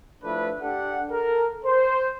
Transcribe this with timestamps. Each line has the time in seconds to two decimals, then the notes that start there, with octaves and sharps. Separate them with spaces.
0.23 F3 A3 D4 E4 A4 B4
0.61 D4 G4 A4 F#5
1.10 A4 A#4
1.66 C5